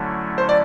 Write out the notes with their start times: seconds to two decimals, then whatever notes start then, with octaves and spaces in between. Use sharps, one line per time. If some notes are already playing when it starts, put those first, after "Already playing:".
Already playing: D3 F#3 A3 C#4 E4
0.38 C5
0.49 D5